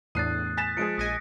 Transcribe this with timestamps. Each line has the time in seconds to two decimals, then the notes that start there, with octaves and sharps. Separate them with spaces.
0.15 E2 A2 D4 D#6 F#6 A6 C7 D#7
0.57 G#5 A6 B6 E7
0.77 F3 G#3 G#4 C#7 D7
0.98 A#1 D#5 G#5 D#6 A#6 C#7